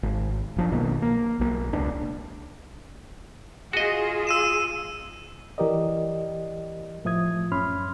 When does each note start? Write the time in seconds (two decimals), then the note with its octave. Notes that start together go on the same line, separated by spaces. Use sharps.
0.03 G#1
0.56 F#1 F3 D4
0.72 B1 B2 D#3 A#3
1.02 A#3
1.39 B1 A#3
1.73 E1 C#2 D4
3.73 F4 F#4 G#4 D#5
4.27 E6 D#7 E7
5.58 E3 G4 A#4 D5 D#5
7.05 A2 F3 E5 D#6 G#6
7.52 F#2 C#4 B5 C6 F6